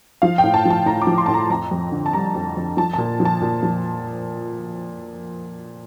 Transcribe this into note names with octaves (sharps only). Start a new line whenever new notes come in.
F3 F5
G5
A2
A5
F3 A5
A2 A#5
D6
F3
C6
A2 A5
A#5
F2 A#5
F2
D3
A5
G3 A#5
F2
F2
F3 A5
A#2 A5
F3
A5
A#2
F3